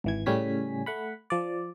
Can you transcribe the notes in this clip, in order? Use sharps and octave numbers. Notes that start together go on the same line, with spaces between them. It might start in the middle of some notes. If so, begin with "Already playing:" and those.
G#1 E3 G#6
A2 C#3 G3 C#4 G#5 B6
A3 F#5 B5
F3 D5